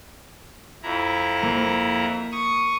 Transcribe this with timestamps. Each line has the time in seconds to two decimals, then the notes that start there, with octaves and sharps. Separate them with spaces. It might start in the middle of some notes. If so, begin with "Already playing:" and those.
0.83 F2 E4 A#5
1.43 A#3
2.32 C#6 D#6